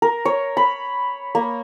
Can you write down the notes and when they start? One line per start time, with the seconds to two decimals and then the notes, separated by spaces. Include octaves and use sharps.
0.02 A#4
0.25 C#5
0.57 B5
1.35 A#3